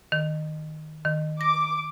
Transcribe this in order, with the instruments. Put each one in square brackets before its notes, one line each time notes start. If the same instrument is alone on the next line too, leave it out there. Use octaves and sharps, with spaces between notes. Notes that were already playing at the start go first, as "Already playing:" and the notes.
[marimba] D#3
D#3
[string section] D6 [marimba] A#6